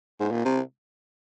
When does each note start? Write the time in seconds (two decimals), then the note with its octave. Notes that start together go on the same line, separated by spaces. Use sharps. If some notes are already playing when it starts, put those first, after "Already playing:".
0.20 G#2
0.31 A#2
0.45 C3